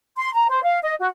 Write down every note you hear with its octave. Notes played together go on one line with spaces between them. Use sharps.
C6
A#5
C5
F5
D#5
F#4